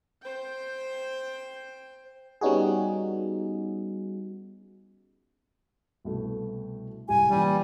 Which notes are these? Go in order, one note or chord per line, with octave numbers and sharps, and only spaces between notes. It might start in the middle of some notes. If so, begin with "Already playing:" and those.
C5 G5
G3 B3 C#4 D#4 F#4 G#4
C2 B2 A3
D1 C2 G4 G#5
A#2 E3 G3 C#4